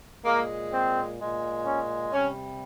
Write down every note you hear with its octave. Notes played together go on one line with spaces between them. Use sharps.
A#2 G#3 A#3
C4
A#2 G#3
C#4
C3 G3 C#4